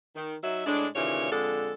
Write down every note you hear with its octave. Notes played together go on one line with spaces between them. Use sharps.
D#3
F#3 D#4 E5
A2 G#3 D4
D#2 A#2 C#3 E3 C#5
F2 D3 G#3 A4